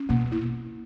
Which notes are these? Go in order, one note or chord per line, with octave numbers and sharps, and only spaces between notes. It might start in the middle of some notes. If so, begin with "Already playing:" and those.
Already playing: C#4
B2 A#3
E4